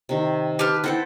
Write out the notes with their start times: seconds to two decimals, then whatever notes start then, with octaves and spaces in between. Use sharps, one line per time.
0.09 C3 D#3
0.59 G4 B4 A5 F6
0.84 C4 E4 A4 F#5 G5